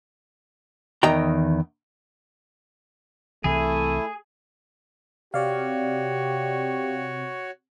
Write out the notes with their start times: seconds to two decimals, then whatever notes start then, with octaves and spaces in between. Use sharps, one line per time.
1.03 E2 D#3 D#5 G5 A#5
3.44 C2 C3 E3 A3 E4 G#4
5.34 C3 F#4 G4 C#5 D5 F5